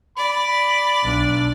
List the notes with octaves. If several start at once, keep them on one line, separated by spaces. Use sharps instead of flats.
D5 B5
B1 D4